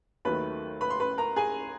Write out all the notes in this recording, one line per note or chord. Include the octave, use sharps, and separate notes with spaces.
D#2 D#3 F#3 A3 B4 B5
B4 B5
C6
B4 B5
A#4 A#5
G#4 G#5